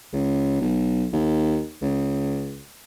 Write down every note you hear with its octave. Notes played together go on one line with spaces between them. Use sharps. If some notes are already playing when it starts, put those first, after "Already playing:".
C#2
B1
D#2
C#2